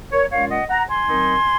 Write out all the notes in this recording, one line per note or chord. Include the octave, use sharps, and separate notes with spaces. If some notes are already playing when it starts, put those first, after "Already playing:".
A#4 C#5
A#2 G#3 C#4 F4 C#5 F5
D#5 F#5
F#5 A#5
G#5 C6
D#3 F#3 C4 D#4